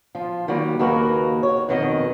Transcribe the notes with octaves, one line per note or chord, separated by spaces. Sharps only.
F3 F4
D#3 F#3 G3 A#3
D#2 C#3 A#3 F#4 A#4 B4
C#5
F2 B2 D#3 F#3 G#4 D#5